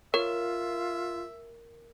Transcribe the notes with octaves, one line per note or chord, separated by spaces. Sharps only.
F4 A#4 C#5 E5